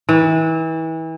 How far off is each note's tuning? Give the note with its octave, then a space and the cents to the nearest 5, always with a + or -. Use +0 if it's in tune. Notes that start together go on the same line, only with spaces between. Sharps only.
E3 -30